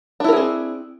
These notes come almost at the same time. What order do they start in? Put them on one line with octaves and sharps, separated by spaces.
D4 E4 A#4 G#4 C4